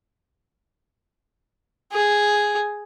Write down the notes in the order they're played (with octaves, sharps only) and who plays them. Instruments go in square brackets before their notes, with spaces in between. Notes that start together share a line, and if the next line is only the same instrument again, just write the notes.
[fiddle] G#4